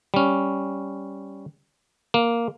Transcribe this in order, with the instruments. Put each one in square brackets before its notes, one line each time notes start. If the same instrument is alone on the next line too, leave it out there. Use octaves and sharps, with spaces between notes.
[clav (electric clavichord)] G3 C#4
A#3